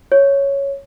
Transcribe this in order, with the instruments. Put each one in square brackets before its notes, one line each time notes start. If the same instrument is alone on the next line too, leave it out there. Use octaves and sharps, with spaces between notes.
[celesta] C#5